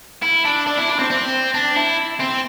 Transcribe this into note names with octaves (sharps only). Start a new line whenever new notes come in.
E4
D4
D4
E4
D4
C4
C4
D4
E4
C4